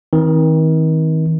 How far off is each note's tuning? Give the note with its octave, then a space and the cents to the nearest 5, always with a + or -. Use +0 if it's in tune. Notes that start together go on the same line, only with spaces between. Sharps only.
D#3 +40 C4 +0